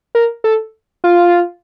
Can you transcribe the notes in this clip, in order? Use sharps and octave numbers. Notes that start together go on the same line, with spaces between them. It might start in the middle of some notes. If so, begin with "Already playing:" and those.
A#4
A4
F4